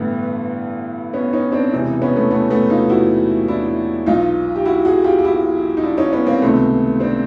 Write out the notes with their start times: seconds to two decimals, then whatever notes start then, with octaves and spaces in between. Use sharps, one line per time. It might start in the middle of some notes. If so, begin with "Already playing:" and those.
Already playing: A1 G2 D3 A3 B3
1.13 B3 C#4
1.33 C#4 D#4
1.52 C4 D4
1.72 E1 E2 C3 E3
2.02 B3 C#4
2.16 A3 B3
2.31 A3 B3
2.51 A3 B3
2.70 D#4 F4
2.89 E4 F#4
3.48 D4 E4
4.06 B1 A#2 D#4 F4
4.56 G4
4.66 E4 F#4
4.85 F#4 G#4
5.04 F4 G4
5.19 G4
5.25 E4 F#4
5.77 D#4
5.83 D4 E4
5.97 C#4 D#4
6.12 B3 C#4
6.27 A#3 C4
6.42 C#2 C3 D#3 A3 B3
7.00 C4 D4